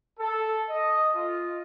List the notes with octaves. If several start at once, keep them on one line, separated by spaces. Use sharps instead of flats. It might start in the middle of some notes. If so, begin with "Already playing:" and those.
A4
D#5
F4